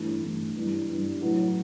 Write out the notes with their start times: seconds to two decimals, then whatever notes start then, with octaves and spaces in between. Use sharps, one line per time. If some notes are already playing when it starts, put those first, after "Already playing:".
Already playing: A1 G2 E3 A3
0.22 A1 G2 E3 A3
0.56 G2 E3 G3
0.88 G2 E3 G3
1.21 A2 F#3 A3 E4 B4